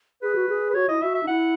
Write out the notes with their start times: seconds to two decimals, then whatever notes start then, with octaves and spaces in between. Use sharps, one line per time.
0.23 G#4 B4
0.35 F#4
0.49 G#4
0.70 B4
0.75 F#4 C#5
0.88 E4 D#5
1.02 F#4 E5
1.14 E5
1.23 D#4
1.27 E4 F#5